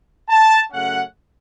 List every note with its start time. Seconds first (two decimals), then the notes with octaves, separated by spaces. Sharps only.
0.29 A5
0.71 F#2 C#3 A3 C#4 F#5